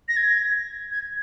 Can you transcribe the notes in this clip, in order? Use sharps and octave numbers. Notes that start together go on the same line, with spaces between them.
A#6
G#6
G#6